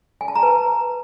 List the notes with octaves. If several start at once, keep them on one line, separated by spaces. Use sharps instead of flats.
G#5
A5
A#5
B4